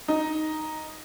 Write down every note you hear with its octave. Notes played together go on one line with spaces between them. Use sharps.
D#4